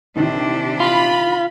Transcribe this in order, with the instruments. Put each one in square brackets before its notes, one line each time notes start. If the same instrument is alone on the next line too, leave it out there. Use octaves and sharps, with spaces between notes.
[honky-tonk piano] A#1 D#3 E3 [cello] C3 D4
[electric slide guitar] F4 [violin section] B5